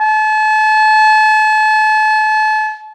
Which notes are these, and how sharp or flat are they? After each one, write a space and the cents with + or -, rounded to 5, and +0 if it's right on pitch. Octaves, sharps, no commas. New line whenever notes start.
A5 -35